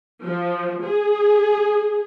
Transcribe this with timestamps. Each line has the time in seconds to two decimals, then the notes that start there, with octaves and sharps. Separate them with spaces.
0.22 F3
0.83 G#4